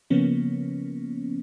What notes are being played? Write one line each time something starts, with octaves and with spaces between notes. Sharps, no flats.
C#3 F3 A#3 B3 C#4